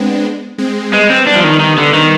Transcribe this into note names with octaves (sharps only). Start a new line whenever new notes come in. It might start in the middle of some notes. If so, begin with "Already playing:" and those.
Already playing: G#3 B3 C4 D4
G#3 C4
G3 G#3 B3
C4
D4
F3
D#3
D#3
D3
D#3